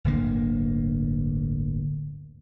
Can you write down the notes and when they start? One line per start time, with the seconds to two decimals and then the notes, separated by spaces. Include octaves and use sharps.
0.04 D1 G1 D3 A#3